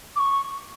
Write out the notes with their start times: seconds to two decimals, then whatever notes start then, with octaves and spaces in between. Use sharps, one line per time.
0.16 D6
0.19 C#6